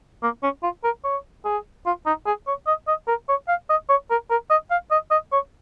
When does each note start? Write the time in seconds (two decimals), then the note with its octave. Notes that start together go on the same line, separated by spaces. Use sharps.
0.23 A#3
0.43 C#4
0.63 F4
0.84 A#4
1.04 C#5
1.45 G#4
1.86 F4
2.06 D#4
2.26 G#4
2.47 C#5
2.67 D#5
2.88 D#5
3.08 A#4
3.29 C#5
3.49 F5
3.70 D#5
3.89 C#5
4.10 A#4
4.30 A#4
4.50 D#5
4.71 F5
4.91 D#5
5.11 D#5
5.33 C#5